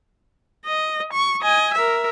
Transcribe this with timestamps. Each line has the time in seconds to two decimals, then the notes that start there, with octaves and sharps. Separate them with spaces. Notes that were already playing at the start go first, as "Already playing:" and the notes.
0.66 D#5
1.13 C#6
1.42 D#5 G#5
1.74 A#4 E5